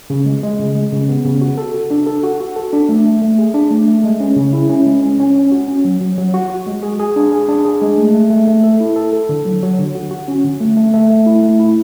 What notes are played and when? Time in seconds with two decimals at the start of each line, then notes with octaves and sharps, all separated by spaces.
0.10 C#3
0.26 G#3
0.43 G#3
0.59 C#3
0.75 G#3
0.92 C#3
1.09 B3
1.25 C#3
1.41 F#4
1.58 A4
1.75 F#4
1.91 D4
2.07 A4
2.23 F#4
2.40 F#4
2.56 A4
2.73 D4
2.89 A3
3.06 A3
3.22 A3
3.38 G#4
3.54 D4
3.71 A3
3.87 A3
4.04 G#3
4.20 C#4
4.36 C#3
4.53 E4
4.69 C#4
4.86 G#3
5.03 C#4
5.19 C#4
5.36 C#4
5.52 F#4
5.68 C#4
5.85 F#3
6.01 F#3
6.18 F#3
6.34 F#4
6.50 F#4
6.66 G#3
6.83 G#4
6.99 G#4
7.16 D4
7.32 G#4
7.48 D4
7.65 G#4
7.82 G#3
7.98 A3
8.14 A3
8.30 A3
8.47 A3
8.64 A4
8.80 E4
8.96 A4
9.13 A4
9.29 D3
9.45 F#3
9.63 F#3
9.79 D3
9.95 F#4
10.11 F#4
10.28 C#4
10.44 D3
10.61 A3
10.77 A3
10.93 A3
11.10 A3
11.26 E4
11.43 A3
11.59 E4